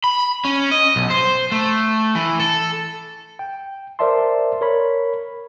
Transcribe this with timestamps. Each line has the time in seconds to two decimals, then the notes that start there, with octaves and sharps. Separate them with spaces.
0.04 B5
0.45 C#4
0.71 D#5
0.96 B1
1.10 C5
1.52 A3
2.15 E3
2.40 A4
3.39 G5
3.99 A#4 C5 D5 E5 A5 C6
4.61 A#4 C#5 B5